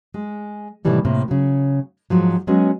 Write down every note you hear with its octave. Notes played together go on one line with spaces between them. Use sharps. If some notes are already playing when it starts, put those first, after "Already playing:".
G#3
A2 C3 D#3 E3 G3 A3
A2 C3 A#3
C#3 F#3
G#2 F3 F#3
F#3 G#3 B3 C#4 F#4